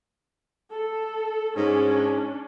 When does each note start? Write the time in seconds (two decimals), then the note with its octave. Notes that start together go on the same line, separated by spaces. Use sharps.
0.71 A4
1.57 G#2 C#4 D4